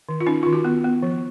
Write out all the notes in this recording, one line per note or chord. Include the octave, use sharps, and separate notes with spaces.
D#3
F4
C#4 D#4
D#3 F4
F#4
B3
B3
F3